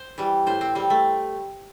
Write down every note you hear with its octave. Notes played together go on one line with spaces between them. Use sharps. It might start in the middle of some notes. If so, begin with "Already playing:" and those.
Already playing: C5
E3 G3
A2 C5
C4
G3 C4
A3